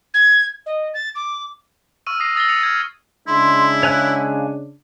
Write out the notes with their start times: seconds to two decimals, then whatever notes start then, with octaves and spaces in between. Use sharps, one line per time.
0.14 G#6
0.66 D#5
0.94 A6
1.15 D6
2.07 C#6 E6 F6 D#7
2.20 D#6 E6 A#6 C7
2.35 D#6 E6 A6 A#6 C7 G7
2.49 D#6 A6 A#6 C#7 F7
2.63 F6 G#6
3.27 C#3 G#3 D4 E4 C6
3.83 C#5 F5 G#5 F#6